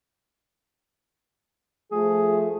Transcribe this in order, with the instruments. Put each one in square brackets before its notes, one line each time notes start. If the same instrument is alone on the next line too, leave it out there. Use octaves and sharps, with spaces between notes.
[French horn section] F3 A3 [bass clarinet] G#4